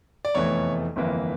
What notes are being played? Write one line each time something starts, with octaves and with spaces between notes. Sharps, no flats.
D5
F1 E2 E3 A3 C#5
G1 F2 E3 A#3